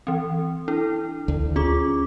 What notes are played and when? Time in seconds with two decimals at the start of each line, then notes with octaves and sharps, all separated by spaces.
0.07 E3 C4
0.68 D4 E4 A4
1.28 D2
1.56 C#4 F4 G#4 D6